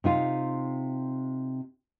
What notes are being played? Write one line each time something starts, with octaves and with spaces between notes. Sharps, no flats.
C3 D#4 F4